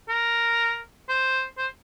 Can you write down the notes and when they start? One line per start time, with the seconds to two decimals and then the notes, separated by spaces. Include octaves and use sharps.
0.09 A#4
1.09 C5
1.58 C5